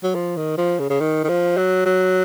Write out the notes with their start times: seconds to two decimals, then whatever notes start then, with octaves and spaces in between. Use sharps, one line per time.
0.03 F#3
0.15 F3
0.37 D#3
0.58 F3
0.79 C#3
0.90 C#3
1.00 D#3
1.24 D#3
1.29 F3
1.57 F#3
1.86 F#3